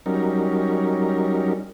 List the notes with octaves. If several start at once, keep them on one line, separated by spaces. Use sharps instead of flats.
F#3 G3 C#4 D#4 A#4